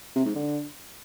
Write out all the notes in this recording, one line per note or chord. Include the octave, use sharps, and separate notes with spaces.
C3
G#2
D3